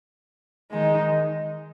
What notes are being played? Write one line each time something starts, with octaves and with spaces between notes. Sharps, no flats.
D#3 G#3 D#4